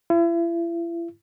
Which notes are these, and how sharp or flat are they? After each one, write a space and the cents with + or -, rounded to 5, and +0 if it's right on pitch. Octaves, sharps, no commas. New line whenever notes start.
E4 +40